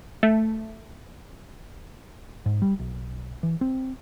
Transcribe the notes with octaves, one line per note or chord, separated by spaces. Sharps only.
A3
G#2
G3
B1
E3
C4